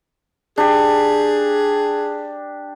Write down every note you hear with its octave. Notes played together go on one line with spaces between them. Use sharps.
D4 G4 G#4